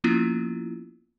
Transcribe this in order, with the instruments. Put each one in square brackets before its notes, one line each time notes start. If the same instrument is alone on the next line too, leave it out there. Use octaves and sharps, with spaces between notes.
[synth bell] F3 A#3 B3 C#4 E4 F4